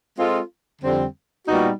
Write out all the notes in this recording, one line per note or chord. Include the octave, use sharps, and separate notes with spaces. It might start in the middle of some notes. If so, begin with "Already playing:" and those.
G#3 C4 F4 A4
F2 D3 G3 C4
A#2 G3 B3 D#4 F#4